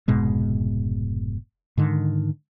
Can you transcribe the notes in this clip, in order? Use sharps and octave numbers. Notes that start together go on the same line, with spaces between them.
F1 G#2 B2 G#3
G#2 D3 D#3